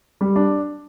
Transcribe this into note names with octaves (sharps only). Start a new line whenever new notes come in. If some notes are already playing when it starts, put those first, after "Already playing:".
G3
D4